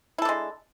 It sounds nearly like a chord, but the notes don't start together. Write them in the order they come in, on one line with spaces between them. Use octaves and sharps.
E4 A4 D4 G#3